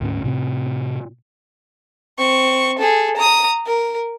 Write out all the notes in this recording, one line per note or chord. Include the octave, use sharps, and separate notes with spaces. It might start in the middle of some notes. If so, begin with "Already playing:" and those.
D2 G#2 C#4
A2 C3 C4
C4 C#6
G#4 A4
A#5 D#6
A#4